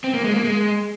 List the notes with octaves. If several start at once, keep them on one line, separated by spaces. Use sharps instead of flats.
C4
A#3
G#3
A#3
G#3